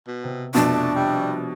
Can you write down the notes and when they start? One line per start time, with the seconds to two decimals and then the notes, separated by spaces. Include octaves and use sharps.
0.07 B2
0.24 C3
0.55 F2 B2 A3 D4
0.95 G3 G4 C#5 E5